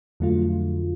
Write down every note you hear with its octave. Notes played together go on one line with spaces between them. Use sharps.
F2 D3 F#3 A3 F4